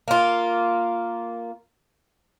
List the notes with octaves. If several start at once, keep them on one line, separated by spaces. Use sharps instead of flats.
A#3 F4